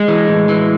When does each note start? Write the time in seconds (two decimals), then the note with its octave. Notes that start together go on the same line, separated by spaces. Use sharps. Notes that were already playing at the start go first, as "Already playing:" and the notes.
Already playing: G#3
0.08 E3
0.28 A2
0.49 E3